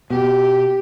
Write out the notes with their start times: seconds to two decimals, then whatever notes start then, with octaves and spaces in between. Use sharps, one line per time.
0.10 B2 G4